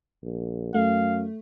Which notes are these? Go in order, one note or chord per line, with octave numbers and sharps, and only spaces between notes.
A#1
F#2 A3 F5